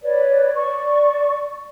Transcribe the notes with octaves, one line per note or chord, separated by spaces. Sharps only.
B4 C#5 D5
D5 C#6